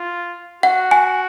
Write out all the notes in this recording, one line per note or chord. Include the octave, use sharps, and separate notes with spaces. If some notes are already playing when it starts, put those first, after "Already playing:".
Already playing: F4
F#4 F#5
G#5